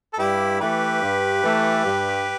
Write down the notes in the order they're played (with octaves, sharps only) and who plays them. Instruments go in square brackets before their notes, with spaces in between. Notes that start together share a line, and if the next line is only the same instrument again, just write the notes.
[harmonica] A4
[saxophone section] G2 [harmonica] E4 G4
[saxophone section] E3 A3 [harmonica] G4 B4
[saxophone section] G2
E3 A3
G2